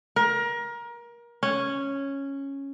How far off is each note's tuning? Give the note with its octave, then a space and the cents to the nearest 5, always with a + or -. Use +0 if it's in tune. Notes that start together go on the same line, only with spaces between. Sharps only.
A#4 +25
C#4 -5